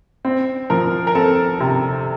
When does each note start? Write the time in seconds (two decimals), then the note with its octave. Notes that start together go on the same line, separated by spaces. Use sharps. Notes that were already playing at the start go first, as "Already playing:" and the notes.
0.25 C4
0.70 F3 A#4
1.07 A#4
1.15 C4 A4
1.60 C3